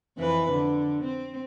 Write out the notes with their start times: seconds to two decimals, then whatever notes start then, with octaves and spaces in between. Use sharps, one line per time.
0.17 F2 E3 B4
0.52 D3
1.04 C4